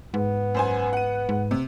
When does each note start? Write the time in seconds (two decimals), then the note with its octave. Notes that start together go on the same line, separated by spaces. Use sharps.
0.14 G#2 B3
0.55 F#2 C5 G#5
0.93 F#5 D#7
1.29 G#2
1.51 C3